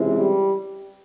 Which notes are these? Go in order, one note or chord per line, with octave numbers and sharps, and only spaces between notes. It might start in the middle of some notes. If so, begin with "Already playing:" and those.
Already playing: C#2 C3 E3
G3